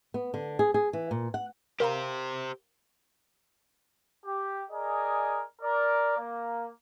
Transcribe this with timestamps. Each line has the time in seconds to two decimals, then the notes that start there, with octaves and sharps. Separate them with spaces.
0.14 B3
0.34 D3
0.59 G#4
0.74 G#4
0.93 E3
1.11 A#2
1.34 F#5
1.80 G4 A#4 C5 F5 A#5
4.25 G4
4.70 G#4 A#4 D5 D#5 G#5
5.62 A#4 D5
6.18 A#3